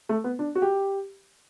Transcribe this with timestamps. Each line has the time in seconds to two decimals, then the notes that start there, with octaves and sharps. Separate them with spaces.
0.09 A3
0.24 B3
0.39 D4
0.55 F#4
0.62 G4